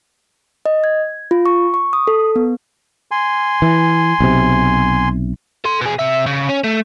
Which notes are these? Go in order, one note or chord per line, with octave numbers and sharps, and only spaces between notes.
D#5
G#6
F4
C#6
C#6
D#6
A4
B3
G#5 C6
E3
B1 C3
A4 C6
B2 G#4
C3 E5
C#3
C#4
A3